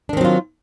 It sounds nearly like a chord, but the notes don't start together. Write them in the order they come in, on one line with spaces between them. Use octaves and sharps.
D4 D#3 C4 F#3 F4